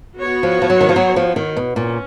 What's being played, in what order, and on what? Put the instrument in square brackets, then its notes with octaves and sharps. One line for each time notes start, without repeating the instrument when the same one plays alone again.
[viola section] B3 F#4 C#5
[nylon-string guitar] F3
F3
F#3
D#3
F3
F#3
F3
D#3
B2
[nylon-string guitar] A#2 [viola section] C#4